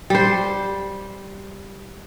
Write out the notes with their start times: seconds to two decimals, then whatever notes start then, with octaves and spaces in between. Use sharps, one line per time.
0.10 G3 C5